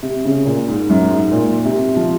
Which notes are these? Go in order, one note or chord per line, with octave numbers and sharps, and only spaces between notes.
C3
C#3
A#2
G#2
F#2
G#2
A#2
C3
F3